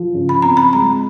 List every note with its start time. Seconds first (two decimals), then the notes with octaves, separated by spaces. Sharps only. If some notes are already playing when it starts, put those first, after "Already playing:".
Already playing: F3
0.14 C#3
0.29 B5
0.42 C4 A#5
0.57 B5
0.73 G#3 A#5